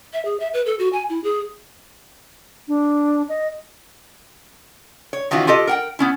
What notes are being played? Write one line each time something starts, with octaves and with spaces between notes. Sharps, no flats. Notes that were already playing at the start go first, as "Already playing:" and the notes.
E5
G#4
E5
B4
A4
F#4
G#5
E4
G#4
D4
D#5
C#5
D#3 E3 C#4 F4 F#4
F4 G4 A4 D#5
A#4 F#5 G5
B3 C#4 E4